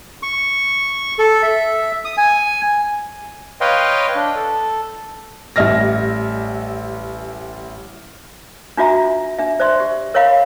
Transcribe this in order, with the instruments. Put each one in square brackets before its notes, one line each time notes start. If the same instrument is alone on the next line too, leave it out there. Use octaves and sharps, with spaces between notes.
[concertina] C#6
A4
E5
D#6
G#5
[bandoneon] B4 C#5 D#5 F5 G5 C6
D4
A4
[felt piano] A1 G3 E5 F6 A#6
[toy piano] D4 F4 F#4 E5 A#5
D4 E5
C5 D5 E5 C6
G4
A#4 C#5 D#5 F5 B5